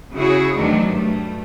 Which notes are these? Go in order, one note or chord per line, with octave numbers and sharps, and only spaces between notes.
C#3 E4 F#4 G#4 C#5
E2 D#3 F#3 A3 D4
G2 A3